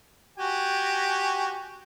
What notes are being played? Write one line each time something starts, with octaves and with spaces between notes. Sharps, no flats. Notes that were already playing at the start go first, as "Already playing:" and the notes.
F#4 G4 G#5